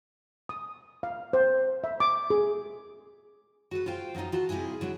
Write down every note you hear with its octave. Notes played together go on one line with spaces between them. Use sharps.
D#6
F5
C5
E5
D6
G#4
F#4 A4 B4
F4 C5 F5 G5
F3 F#3 C4 D#4 F4
F4 F#4 A4 A5
C3 G#3 E4 F4 G#4
D3 F#3 D4 E4